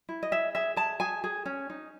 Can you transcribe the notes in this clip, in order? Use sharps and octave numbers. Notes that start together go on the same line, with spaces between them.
E4
D#5
G#4 E5
G#4 E5
G#4 A5
G#4 G#5
G#4
C#4
D#4